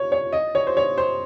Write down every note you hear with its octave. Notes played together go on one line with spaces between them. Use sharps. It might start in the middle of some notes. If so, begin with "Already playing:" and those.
Already playing: C#5
C#5
D#5
C#5
C5
C#5
C5